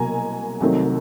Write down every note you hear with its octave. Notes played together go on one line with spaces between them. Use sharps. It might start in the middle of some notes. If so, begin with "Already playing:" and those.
Already playing: C2 B2 F#3 A#3 G#5 A#5
C2 C3 D#3 F#3 A3